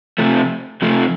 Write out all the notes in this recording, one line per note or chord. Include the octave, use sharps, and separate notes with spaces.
C3 F3 A3
C3 F3 A3